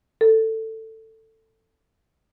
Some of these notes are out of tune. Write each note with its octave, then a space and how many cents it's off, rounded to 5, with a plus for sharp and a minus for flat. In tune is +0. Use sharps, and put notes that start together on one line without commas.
A4 +15